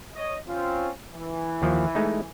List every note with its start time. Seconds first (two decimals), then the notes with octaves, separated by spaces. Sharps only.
0.15 C#5 D#5
0.48 C4 C#4 F4
1.13 E3
1.62 D#2 D#3 F3
1.95 G#3 A3 D#4